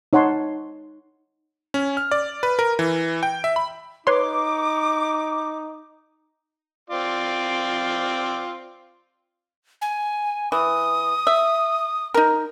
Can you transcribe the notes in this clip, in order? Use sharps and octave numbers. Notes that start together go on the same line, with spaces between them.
D#4 C#5 F#5 A5 C6
C#4
F6
D5
B4
A#4
E3
G5
E5
B5
D#4 B4 C#5 C6 D6
C4 F4 D5
G#5
E3 D#6
E5
D#4 A#4